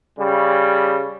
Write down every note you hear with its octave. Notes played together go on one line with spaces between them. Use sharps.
C#3 G3